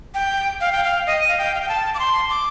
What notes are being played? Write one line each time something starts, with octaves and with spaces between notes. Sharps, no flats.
G5
F5
G5
F5
D#5
F5
G5
F5
G5
A5
D6
C6
D6